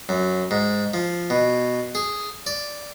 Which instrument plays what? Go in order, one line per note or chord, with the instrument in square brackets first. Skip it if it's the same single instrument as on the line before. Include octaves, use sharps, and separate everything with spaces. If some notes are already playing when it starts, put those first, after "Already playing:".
[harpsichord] F#2
G#2
F3
B2
G#4
D5